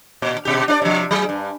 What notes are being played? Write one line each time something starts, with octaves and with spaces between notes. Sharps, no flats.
A#2
B2 G4
D4 D#4 D5
C3 F3
F#3 G#4
G2